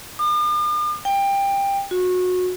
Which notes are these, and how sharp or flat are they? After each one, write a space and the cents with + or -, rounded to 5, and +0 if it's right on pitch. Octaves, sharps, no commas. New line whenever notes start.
D6 +45
G5 +20
F#4 -25